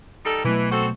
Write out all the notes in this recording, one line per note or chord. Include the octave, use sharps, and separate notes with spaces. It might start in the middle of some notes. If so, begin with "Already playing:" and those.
G3 D#4 A4
B2 E3 F#3 A3
C4 F#4 A4